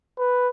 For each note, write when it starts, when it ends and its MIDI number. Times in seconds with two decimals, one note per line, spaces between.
0.18 0.49 71